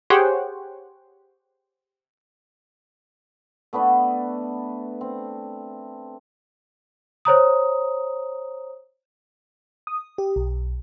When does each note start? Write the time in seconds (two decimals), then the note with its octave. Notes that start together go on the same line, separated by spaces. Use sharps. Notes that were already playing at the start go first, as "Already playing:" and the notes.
0.10 G4 G#4 C5 C#5 F#5 G5
3.73 A3 B3 D4 B4
5.01 C4
7.25 C5 C#5 A#5 D#6
9.87 D#6
10.18 G4
10.36 B1